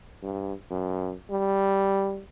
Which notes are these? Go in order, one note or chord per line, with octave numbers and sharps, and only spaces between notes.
G2
F#2
G3